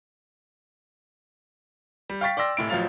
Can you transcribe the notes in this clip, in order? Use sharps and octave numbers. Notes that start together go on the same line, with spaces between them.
G3
F5 G5 C#6 A6 B6
D5 G5 C6 E6 A#6
F1 A2 D7
A1 F3 F#3 F5 A6 F7